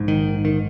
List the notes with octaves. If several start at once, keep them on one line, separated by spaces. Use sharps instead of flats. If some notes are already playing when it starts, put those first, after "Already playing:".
Already playing: A#1 G#2
D#3
D#3